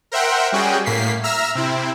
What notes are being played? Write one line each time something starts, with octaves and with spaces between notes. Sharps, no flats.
A#4 C5 E5 F#5 G5
G3 C#4 F#4 G#4 G5
A2 A#3 B6 C7
E5 A#5 E6 F6
C3 C4 E4